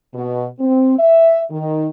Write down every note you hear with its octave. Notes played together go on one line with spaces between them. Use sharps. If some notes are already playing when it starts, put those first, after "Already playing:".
B2
C4
E5
D#3